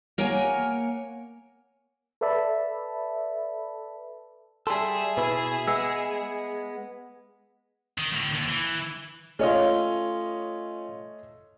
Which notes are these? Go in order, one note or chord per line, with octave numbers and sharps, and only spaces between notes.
A#3 A#4 C#5 F#5 G#5 A#5
A4 B4 D5 E5 A5 B5
G3 G#4 A4 E5 C6
B2 E4 B4
G#3 B3 E6
D#3
A2 D3
D#2
E3
A3 C#4 F4 C#5 D#5